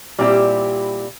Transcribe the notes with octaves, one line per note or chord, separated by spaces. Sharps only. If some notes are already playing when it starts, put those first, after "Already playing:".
A#2 G3 C4 E4 G4